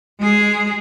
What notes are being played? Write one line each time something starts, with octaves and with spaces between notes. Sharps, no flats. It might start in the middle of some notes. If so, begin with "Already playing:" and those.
G#3 G#4